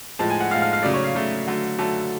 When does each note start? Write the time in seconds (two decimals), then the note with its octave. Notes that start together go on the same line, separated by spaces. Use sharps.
0.19 A2 F3 G#3 A5
0.30 G#5
0.40 F#5
0.51 A2 F3 G#3 F5
0.62 F5
0.73 F5
0.83 C#3 F#3 A3 D5
0.94 C#5
1.04 F5
1.15 C#3 F#3 A3
1.47 D3 F#3 A3
1.79 D3 F#3 A3 A5